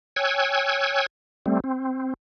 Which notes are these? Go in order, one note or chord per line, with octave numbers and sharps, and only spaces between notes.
C#5 G5 G#5 E6 F#6 G#6
G3 A3 C4
C4